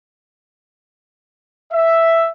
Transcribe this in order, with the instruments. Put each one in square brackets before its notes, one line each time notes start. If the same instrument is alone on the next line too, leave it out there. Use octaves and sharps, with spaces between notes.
[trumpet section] E5